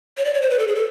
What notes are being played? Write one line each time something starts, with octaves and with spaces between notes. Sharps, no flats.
C#5
D5
C#5
C5
B4
A4
G#4
A4